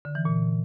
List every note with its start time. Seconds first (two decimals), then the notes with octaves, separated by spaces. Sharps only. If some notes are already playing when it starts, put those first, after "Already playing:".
0.05 D3
0.15 E3
0.25 A#2